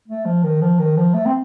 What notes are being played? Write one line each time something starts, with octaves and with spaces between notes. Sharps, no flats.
A3
F3
D#3
F3
D#3
F3
A3
C4